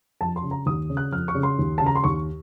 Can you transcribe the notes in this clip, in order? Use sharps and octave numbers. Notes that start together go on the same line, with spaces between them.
F2 A5
C6
C#3
A#5
D#2 D#6
C#3
F#6
F2 F6
C#6
C#3
C6
D#2
C#3 A5
A#5
C6
D#2 C#6